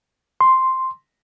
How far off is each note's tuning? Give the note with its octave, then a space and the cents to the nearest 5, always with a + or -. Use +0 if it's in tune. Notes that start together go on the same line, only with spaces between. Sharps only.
C6 +0